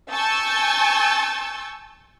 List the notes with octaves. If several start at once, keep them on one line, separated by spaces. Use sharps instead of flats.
G#5 A5 C#6 E6 G6 A6